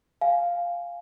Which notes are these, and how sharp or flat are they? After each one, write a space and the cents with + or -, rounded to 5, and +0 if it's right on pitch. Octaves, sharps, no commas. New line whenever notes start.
F5 +0 G#5 +5